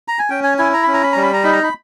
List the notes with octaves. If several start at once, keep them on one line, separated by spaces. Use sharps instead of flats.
A#5
G#5
C#4 G5
G#5
E4 G#5
A#5
C#4 B5
A#5
B5
G3 A#5
B5
A#5
D#4 B5
A#5
B5